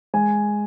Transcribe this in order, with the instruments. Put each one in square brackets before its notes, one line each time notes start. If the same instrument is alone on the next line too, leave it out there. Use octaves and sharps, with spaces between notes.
[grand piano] G#3 G#5